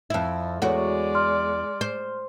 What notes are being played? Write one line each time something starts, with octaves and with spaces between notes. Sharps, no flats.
F2 E4
E2 G#3 F#4 A4 C#5 D5
C6 F6
C5